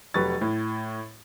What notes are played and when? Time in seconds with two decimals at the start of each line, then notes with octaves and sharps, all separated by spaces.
0.14 F1 F#3 B4 C#6 A6
0.41 A2